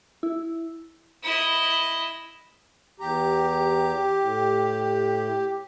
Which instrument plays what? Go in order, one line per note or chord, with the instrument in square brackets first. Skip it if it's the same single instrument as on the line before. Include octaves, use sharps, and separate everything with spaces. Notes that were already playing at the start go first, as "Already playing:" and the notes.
[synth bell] E4
[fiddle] E4 D#5
[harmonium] E2 A#5 [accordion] G4
[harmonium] A2